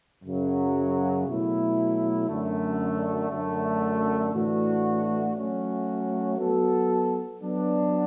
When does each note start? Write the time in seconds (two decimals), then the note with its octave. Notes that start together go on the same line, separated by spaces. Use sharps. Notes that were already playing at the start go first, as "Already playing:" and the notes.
0.23 F#2 C#3 F#3
1.27 B2 F#3 A3 E4
2.29 F#2 D3 A3
3.31 F#2 D3 A3
4.33 A2 E3 A3 D4 F#4
5.35 F#3 A3 C#4 F#4
6.38 F#3 B3 F#4 A4
7.41 F#3 B3 D4